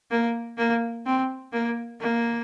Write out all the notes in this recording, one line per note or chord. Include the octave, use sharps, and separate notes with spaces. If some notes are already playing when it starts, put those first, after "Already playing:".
A#3
A#3
C4
A#3
A#3